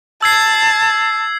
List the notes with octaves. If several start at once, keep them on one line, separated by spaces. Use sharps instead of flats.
A5 E6 G#6 C7